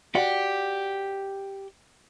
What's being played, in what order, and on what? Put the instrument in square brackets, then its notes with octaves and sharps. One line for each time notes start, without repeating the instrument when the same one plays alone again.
[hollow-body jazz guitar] F#4 D5 F#5 [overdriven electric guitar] G4